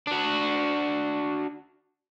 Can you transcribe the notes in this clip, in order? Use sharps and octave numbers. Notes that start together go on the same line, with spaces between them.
D4 F#4